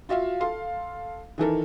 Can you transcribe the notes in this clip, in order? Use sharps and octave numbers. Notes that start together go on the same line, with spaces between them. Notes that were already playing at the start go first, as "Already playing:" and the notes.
F4 F#4 E5 F5
A4 F5 C6
D#3 E3 A4 A#4